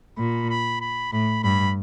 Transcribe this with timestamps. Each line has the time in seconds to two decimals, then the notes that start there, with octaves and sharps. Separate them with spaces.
0.18 A#2 B5
0.50 B5
0.81 B5
1.13 A2 B5
1.44 G2 B5